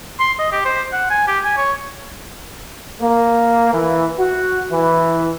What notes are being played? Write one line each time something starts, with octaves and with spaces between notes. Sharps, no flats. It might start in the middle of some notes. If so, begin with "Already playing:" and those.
C6
D#5
G4
C5
F#5
G#5
G4
G#5
C#5
A#3
E3
F#4
E3